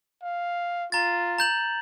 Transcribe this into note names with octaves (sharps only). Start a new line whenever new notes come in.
F5
F4 A#5 A6
A#5 G6 F#7